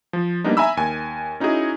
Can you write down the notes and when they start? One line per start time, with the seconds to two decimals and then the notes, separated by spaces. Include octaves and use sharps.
0.13 F3
0.44 G3 A#3 B3 D4 D#4
0.57 E5 G#5 A#5 B5 E6
0.77 D#2 G#5
1.40 C#4 D#4 E4 F#4 G#4